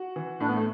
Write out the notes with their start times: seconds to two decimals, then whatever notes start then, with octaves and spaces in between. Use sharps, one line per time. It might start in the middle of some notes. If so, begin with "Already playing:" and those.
Already playing: F#4
0.16 E3
0.40 A2 D4
0.49 B3
0.56 A3